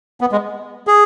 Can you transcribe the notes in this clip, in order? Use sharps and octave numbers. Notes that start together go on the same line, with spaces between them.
B3
G#3
G#4